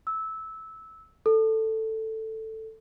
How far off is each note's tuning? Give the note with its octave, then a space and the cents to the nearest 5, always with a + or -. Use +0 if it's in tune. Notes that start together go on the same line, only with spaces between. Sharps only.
E6 -15
A4 +5